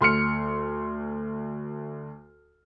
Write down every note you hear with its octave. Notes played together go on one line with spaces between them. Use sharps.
D2 C6 F6 C#7